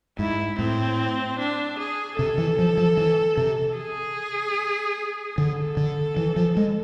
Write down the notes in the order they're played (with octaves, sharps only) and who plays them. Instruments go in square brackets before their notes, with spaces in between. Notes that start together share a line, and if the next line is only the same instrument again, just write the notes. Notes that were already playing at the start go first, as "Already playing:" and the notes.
[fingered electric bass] G#2 [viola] E4
[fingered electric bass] A2 [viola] C4
[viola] D4
G#4
[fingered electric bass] C3 [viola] A4
[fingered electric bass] E3
F3
F3
E3
C3
[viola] G#4
[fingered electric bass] D3 [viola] A4
[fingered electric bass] D3
E3
F3
G#3